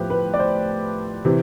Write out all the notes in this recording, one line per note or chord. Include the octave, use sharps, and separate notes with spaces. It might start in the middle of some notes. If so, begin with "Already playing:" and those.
Already playing: A2 F3 B3 G4 B4 C5
B4
D5
C5
C3 E3